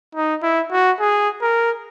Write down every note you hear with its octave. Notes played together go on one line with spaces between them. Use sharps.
D#4
E4
F#4
G#4
A#4